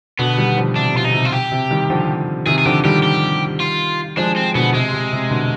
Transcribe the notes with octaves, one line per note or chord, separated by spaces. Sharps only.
B2 D3 B3
D#3 G3
D3 F3
C3 D4
B2 F4
D#4
C3
F4
G4
C3
D#3 G3
D3 F3
C3 D#3 G#4
G#4
D3 F3 G4
D#3 G3 G4
G4
F4
F3 G#3 D4
C4
B2 D3 B3
C3 G#3
C3
C3
B2 D3